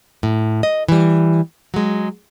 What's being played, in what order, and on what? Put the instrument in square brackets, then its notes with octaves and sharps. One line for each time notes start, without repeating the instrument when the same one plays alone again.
[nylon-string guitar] A2
D#5
E3 G3
F#3 G#3